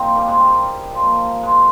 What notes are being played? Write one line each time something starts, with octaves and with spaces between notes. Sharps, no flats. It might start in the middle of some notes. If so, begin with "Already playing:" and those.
Already playing: A#2 F3 C4 D#4 F4
G3 A#3
G#3
G3
A#2 F3
G#3